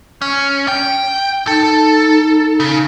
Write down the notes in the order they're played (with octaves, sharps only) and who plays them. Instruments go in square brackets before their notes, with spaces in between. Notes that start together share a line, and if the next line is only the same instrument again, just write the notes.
[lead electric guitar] C#4
G5
[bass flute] D#4 [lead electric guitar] A4
[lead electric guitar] C#3